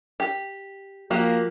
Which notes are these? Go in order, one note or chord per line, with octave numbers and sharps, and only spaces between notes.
G4
F3 A#3 F#4 G4